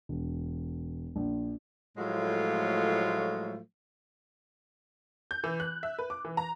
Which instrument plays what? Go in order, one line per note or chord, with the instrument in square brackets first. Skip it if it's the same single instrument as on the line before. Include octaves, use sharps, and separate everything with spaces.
[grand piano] E1
A#1
[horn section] A2 F3 F#3 G#3 A3 F4
[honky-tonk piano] G6
E3
F#6
E5
B4
D6
E3
A#5